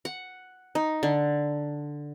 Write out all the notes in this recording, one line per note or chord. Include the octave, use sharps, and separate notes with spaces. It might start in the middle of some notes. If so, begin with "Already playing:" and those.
F#5
D#4
D3